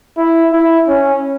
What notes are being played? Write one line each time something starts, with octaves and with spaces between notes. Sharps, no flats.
E4
E4
C#4